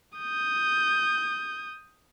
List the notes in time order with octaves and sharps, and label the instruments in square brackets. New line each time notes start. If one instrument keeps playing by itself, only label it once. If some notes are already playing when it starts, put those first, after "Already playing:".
[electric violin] D#6 G6